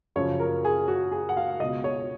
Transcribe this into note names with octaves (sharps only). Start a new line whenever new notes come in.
F#2 C#3 F3 C#5
A#4
G#4
F#4
G#4
F#5
F5
C#2 B2 D#5
C#5